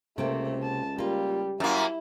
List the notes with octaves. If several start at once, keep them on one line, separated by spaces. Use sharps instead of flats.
C#2 C3 A3 A#3 C4
A5
G3 A#3 F4
F#2 A#3 C#4 E4